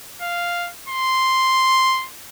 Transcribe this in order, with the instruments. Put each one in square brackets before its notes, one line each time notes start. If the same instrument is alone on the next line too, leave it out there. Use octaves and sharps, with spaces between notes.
[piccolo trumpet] F5
C6